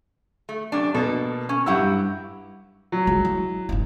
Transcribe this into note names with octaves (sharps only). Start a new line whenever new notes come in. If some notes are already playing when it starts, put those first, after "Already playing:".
A3
F#2 C3 D4
B2 A#3 A4
C#4
G2 F#3 E4 G4 F#5 E6
F#3
D2 G#3
E4
G1 D#4